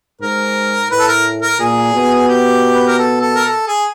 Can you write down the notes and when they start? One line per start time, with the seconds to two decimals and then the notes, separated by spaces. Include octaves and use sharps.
0.21 G#2 A#4
0.90 A2 B4
0.99 A4
1.08 A#4
1.42 A#4
1.59 A#2 G#4
1.94 B2
2.28 G4
2.74 B4
2.87 A#4
2.99 A4
3.21 A4
3.35 A#4
3.45 A4
3.67 G#4